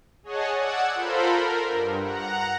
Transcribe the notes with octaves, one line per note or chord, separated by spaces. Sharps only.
G#4 C#5 D#5 F#5 G#5 A5
D5 F#5 E6 G#6
F4 A4 A#4 C5 B5
A#4
G2
F#5 A#5